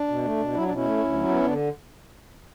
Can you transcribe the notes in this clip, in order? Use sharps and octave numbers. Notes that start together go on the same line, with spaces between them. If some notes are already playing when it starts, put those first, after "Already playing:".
Already playing: D4
B2
A3
B2
F#3 E4
D4
B2 C#4 E4
A3
D2
F#3
B3
D3 D4